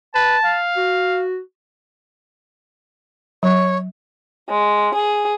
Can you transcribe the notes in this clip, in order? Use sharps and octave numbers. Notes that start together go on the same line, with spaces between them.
B4 A5
F5
F#4
F#3 C#5
G#3
G#4